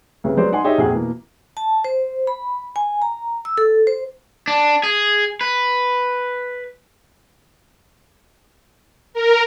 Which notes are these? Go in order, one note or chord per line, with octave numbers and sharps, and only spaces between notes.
C2 C#3 B3
F#3 G#3 B3 C5 D5
D#4 F#5 G#5 C6
D#4 G4 G#4 C#5 D#5 E5
A#1 F2 G#4 F#5 G5
B2 E3 A#3
A5
C5
B5
G#5
A#5
E6
A4
C5
D4
G#4
B4
A#4